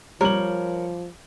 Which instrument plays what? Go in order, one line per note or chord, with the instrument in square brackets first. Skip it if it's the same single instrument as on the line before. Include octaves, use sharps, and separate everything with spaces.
[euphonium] F3 [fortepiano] G3 [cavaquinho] A#4 [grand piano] C#5 F#7